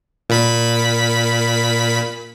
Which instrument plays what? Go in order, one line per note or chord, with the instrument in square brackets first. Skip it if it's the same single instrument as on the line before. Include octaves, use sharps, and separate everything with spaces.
[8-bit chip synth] A#2 B5 B6